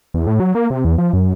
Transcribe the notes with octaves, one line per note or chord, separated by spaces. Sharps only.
E2
A2
F#3
A#3
C3
E2
F3
F#2